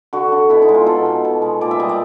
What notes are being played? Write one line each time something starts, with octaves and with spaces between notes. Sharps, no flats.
D3 F#4
D3
B2 E4
D#4
G#3
F4
B2 A4
B2
B2
G#3
A#2 D5
E5
G3 D#5
D5